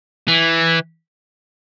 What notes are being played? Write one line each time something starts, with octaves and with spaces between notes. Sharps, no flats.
E3